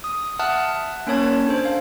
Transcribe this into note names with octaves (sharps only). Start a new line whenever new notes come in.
D#6
E5 F#5 A5 D#6 F6 F#6
A#3 C#4 A#4 C#5 A5 G#6
D4 A4 C5
F5